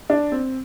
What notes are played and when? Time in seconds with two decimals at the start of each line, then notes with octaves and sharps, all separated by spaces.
0.10 D4
0.32 C4